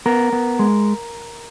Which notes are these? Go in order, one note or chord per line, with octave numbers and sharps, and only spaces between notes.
B3 A#4
B3
G#3